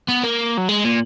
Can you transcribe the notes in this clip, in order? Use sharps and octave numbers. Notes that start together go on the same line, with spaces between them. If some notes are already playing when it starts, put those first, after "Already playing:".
B3
A#3
F#3
G#3
A#2